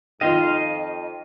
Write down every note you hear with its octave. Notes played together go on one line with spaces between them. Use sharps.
F2 D#3 F4 D#5 F5 C6